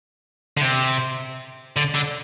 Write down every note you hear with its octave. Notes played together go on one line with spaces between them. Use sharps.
D3
C3
D3
D3